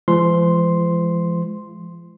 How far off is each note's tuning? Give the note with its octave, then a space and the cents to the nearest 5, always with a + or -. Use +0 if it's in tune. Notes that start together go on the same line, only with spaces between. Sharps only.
F3 -40 G#3 +5 C6 +0